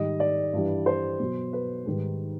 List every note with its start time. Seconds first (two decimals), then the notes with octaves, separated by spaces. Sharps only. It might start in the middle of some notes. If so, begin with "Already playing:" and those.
Already playing: G#2 D#3 G3 D#5
0.20 D5
0.53 G2 E3 G3
0.86 C5
1.20 B2 F#3
1.53 B4
1.86 G#2 D#3 G3